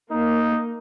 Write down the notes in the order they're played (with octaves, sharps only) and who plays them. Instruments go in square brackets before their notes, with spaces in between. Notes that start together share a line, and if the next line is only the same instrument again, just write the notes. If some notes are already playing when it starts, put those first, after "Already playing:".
[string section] A#3 [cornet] D#4